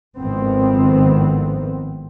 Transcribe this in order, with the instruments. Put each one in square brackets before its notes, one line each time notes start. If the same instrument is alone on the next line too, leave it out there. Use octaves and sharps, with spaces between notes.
[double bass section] G#1 A2 D#3 F3 B3 C4